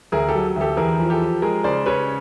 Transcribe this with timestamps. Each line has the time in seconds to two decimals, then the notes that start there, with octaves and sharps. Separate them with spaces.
0.12 D2 G#4 A#4
0.28 G4 A4
0.35 F#3
0.56 D2
0.61 G4 A4
0.77 E2 G#4 A#4
0.99 F3
1.10 G4 A4
1.21 F3
1.42 G#3 G#4 A#4
1.64 C#3 C5 D5
1.86 C#3 B4 C#5